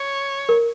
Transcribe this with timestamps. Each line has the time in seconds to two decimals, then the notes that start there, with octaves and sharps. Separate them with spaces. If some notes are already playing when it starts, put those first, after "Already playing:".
Already playing: C#5
0.49 A#4